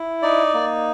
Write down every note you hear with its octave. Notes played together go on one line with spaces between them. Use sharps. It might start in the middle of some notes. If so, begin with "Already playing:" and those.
Already playing: E4
D#4 D5
A#3